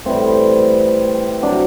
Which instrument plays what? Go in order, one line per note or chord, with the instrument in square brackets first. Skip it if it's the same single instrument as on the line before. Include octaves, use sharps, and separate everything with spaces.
[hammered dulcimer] A2 E3 G3 C4
C3 F#3 D4